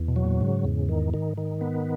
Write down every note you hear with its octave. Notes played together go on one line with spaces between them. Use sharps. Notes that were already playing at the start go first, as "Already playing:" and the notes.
Already playing: E2
B2
F#3
A#2
G#2 C#3
E2
D#3
D#3
D#3
B3